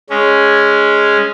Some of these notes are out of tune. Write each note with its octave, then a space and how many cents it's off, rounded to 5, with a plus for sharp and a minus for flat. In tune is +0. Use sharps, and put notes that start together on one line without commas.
G#3 +0 C#4 +0